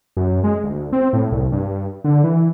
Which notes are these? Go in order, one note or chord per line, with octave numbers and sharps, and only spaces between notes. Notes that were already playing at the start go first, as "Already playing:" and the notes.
F#2
G#3
D2
C4
A2
C2
G2
D3
E3